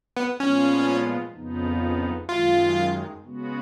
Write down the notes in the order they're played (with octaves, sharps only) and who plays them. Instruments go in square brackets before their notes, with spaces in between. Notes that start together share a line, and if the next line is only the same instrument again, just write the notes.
[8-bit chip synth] B3
[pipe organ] A#2 F3 G#3 B3 F4 [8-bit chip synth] C#4
[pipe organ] F2 C#3 F3 B3 D#4
[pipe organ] F#2 D#3 G#3 [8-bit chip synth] F4
[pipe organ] C#3 G#3 B3 F#4